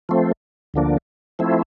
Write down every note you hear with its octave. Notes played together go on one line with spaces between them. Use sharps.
F3 A3 C4
D2 D3 F3 A#3 D4
F3 A3 C4 E4